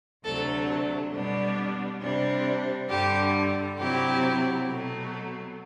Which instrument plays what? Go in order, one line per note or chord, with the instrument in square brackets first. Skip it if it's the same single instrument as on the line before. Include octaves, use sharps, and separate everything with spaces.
[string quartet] D2 C3 F#3 A3 D4 [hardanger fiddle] A4
[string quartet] B2 G3 B3 D4
C3 G3 D4
[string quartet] G2 D3 G3 [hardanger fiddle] G4
[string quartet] C3 F#3 C4 E4 [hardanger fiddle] G4
[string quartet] B2 F#3 A3